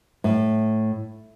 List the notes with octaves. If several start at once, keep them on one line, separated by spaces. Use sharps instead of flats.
A2